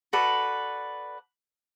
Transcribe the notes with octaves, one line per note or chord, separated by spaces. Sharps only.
F#4 A4 B4 D5